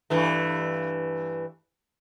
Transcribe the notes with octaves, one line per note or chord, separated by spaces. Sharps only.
G2 E3 A3